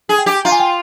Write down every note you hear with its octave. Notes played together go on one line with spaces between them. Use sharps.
G#4
G5
G4
F4 A#5
G#5
G5